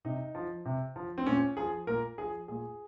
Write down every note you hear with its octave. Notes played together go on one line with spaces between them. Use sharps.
C3 D#4
F3
C3
F3
C4
A#2 C#4
F3 G#4
A#2 A#4
F3 G#4
A#2 G#4